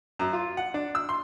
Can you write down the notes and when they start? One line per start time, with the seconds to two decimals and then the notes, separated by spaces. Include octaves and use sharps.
0.19 F#2
0.33 F4
0.57 F#5
0.74 D4
0.95 E6
1.09 C6